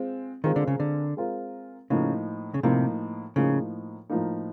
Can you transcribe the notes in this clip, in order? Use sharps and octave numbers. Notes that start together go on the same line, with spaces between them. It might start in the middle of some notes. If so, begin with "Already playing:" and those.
Already playing: G#3 C4 F4
D#3 G#3 C4 F4 A#4
D3
C#3
D3
G#3 C4 F4 A#4
A2 C#3 F3 A#3 D#4
C#3
A2 C3 F3 A#3 D#4
A2 C#3 F3 A#3 D#4
A2 F3 A#3 D#4